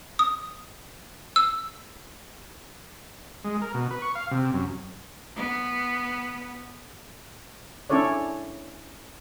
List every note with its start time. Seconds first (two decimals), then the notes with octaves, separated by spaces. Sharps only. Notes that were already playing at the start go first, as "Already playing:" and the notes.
0.19 D#6
1.36 E6
3.44 G#3
3.61 A#4
3.74 B2
3.91 B4
4.02 C#6
4.15 F5
4.31 C3
4.54 F#2
5.36 B3
7.90 C#4 D4 E4 A4 C#5 D5